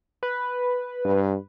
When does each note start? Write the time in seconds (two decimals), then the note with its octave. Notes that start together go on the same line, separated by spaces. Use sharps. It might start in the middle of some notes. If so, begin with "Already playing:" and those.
0.23 B4
1.05 G2